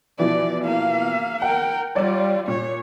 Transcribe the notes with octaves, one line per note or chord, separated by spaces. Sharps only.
B2 E3 F3 D5
A#3 F5
A#4 F#5 G5
G3 F4 C#5 D5
A#2 C#5